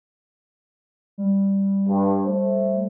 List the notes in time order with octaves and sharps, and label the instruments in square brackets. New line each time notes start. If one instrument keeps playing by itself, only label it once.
[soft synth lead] G3
[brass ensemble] G2
A3 C5